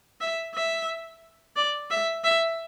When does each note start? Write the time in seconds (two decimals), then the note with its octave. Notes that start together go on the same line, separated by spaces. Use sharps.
0.21 E5
0.55 E5
1.56 D5
1.91 E5
2.24 E5